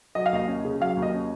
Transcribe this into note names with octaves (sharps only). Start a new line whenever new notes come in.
F#3 D#5
F5
D#2 D#5
C#4
C#3
F#3 F5
D#2
D#5
C#4